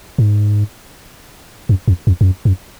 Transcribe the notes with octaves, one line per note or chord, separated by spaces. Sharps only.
G#2
F#2
F2
F2
F2
F#2
F#2